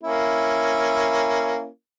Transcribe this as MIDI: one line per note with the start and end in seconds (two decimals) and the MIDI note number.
0.03 1.66 58
0.03 1.66 61
0.03 1.66 64